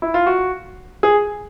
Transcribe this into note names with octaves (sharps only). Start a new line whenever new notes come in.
E4
F4
F#4
G#4